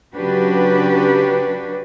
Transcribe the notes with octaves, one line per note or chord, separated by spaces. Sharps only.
C#3 F#3 D4 F#4 G4 B4